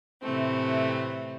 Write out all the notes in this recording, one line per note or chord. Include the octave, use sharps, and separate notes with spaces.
A2 C3 E3 A3 C4